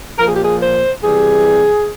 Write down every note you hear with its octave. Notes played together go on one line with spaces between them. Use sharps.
A#2 F3 A#4
G#4
G4
G#4
C5
C3 E3 G3 G#4